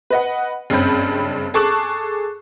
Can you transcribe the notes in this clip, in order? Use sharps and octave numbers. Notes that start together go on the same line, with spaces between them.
B4 D#5 F#5
F#1 G2 C4 C#4 B5 G6
G#4 A4 A5 C#6 D6 F#6